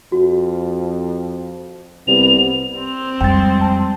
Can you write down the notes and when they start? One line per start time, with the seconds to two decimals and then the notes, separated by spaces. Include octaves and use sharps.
0.12 F2 F#4
2.08 C2 B3 F7
2.78 C4
3.21 F2 G3 G#3 G5 A6
3.61 A5